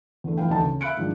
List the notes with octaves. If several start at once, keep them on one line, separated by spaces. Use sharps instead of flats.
E2 D3 A3
F2 E3 F5 G5
D2 E3 D4 D#4 A5
C#3
E5 F5 B5 F#6 C#7 D7
G#2 D#3 F3 D4